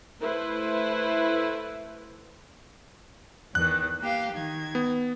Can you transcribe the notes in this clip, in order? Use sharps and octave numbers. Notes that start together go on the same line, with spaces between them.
A3 E4 B4 C5
E2 D#3 F#6
A#3 G4 F5
D#3 G#6
B3